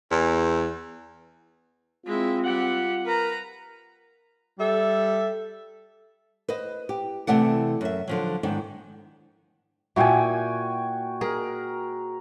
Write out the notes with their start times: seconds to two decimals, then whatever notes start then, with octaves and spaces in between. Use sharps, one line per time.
0.11 E2
2.06 G#3 C4 E4 F4
2.44 G3 G4 F#5
3.06 A#4 B4 A#5
4.60 G3 A4 E5
6.48 B4 C5 D#5
6.89 G4
7.27 C3 E3 A3 D5 F#5
7.81 F#2 E5
8.08 D3 F3 F#3
8.43 G#2 D#3 B3 D4
9.96 A#2 E4 F#4 G5 G#5
11.21 G#4 A#4